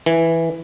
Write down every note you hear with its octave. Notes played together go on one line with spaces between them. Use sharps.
E3